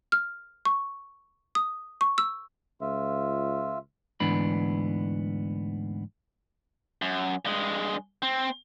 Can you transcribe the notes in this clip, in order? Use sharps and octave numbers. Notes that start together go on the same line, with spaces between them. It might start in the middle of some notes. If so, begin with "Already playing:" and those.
F6
C#6
D#6
C#6
E6
C#2 F4 E5
D2 G#2 E3 B3 D4 B5
F#2
G2 G#3
C4